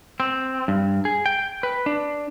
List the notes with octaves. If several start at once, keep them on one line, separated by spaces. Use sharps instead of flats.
C4
G2
G#4
G5
B4
D4